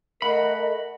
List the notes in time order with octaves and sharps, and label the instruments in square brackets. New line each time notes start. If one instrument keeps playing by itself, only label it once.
[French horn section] A3 A#4 [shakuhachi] D#5 [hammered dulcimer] F#5 [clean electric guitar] B5